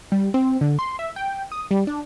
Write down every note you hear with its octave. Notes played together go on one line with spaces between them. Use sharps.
G3
C4
D3
C6
E5
G5
D#6
G3
D4